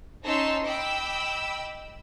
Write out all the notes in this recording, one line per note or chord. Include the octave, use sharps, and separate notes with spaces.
C#4 D#4 A5 C6 E6
D#5 G5 B5 D6 E6